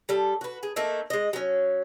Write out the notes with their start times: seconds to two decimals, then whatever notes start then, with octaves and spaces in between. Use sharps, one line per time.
0.09 G3 A4
0.41 F#4 B4
0.63 G#4
0.76 A3 A#3 D#4 E5
1.10 G#3 D#5
1.33 F#3 C#4